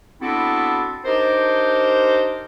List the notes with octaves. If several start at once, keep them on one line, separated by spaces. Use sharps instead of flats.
B3 C4 D4 E4 F#4 A4
D4 D#4 G4 A#4 C5